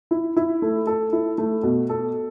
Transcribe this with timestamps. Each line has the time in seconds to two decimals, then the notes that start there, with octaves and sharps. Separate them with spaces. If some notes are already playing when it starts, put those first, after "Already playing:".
0.11 E4
0.37 E4
0.62 A3
0.87 A4
1.13 E4
1.38 A3
1.63 B2
1.89 A4